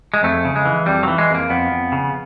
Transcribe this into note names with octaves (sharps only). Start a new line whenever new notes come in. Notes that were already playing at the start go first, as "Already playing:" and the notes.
G#3
F2 A3
C#3
G#3
E3
F2 G3
F#3
E3
G#3
F2
A#3
F2 B3
F2
C#3